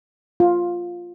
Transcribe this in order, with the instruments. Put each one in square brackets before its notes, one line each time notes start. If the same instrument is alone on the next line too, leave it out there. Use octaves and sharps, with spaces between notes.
[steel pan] F4